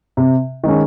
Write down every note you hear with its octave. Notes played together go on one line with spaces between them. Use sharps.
C3
D#3 G#3 C#4